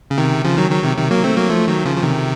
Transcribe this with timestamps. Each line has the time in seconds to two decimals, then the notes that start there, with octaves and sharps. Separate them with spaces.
0.11 C#3
0.18 C3 D#3
0.44 C#3 F3
0.57 D#3 F#3
0.71 D#3 F#3
0.84 C3 D#3
0.97 C3 D#3
1.11 F#3 A#3
1.24 A3 C4
1.37 F#3 A#3
1.50 F3 A3
1.67 D#3 F#3
1.85 C#3 F3
1.96 F3
2.03 C3 D#3